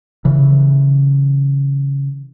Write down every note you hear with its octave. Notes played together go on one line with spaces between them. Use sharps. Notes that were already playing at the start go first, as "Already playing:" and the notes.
C#3 E3